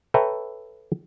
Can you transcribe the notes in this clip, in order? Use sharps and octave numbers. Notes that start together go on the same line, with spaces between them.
A4 B4 C#5 E5 G5 A#5